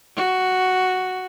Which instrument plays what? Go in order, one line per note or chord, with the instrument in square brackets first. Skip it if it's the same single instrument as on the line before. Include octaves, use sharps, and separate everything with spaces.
[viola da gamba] F#4